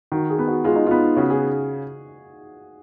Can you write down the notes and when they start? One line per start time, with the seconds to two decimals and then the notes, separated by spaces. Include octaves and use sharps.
0.12 D#3 F#4
0.30 G#4
0.39 B3
0.48 F#4
0.64 G#3 F4
0.75 D#4
0.86 B3 F4
1.16 C#3 F#4
1.30 G#4